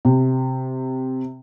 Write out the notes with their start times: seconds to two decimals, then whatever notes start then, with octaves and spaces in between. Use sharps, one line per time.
0.05 C3